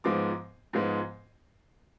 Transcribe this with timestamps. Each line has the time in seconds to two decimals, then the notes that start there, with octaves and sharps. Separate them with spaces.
0.04 G#2 F3 G#3 B3 D6
0.73 G#2 F3 G#3 B3